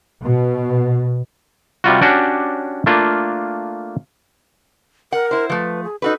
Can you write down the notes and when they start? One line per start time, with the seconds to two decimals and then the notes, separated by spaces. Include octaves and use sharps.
0.23 B2
1.84 C3 G3 F4 F#4
2.02 C#4 D4 F#4 G4 D5
2.86 A3 A#3 D4 F4
5.12 A#4 F#5
5.31 E4 C5
5.50 F3 A3 B4
5.84 G#4
6.02 D#4 F#4 A4 B4